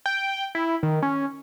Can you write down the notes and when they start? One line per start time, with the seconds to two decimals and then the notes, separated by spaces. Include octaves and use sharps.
0.06 G5
0.55 E4
0.83 D#3
1.03 C#4